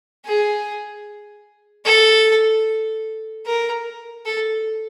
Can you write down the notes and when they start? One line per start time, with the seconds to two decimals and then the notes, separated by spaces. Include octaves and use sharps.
0.25 G#4
1.85 A4
3.46 A#4
4.26 A4